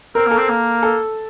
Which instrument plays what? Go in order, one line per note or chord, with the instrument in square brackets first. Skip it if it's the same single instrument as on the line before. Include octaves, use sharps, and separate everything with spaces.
[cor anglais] C4 [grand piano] A#4
[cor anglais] A#3
[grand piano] A4
[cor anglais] C4
A#3
[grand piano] A4